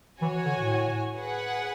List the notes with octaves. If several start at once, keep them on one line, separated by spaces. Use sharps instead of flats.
E3 F#4 C#5 G#5
D3
A2
G#4 B4 F#5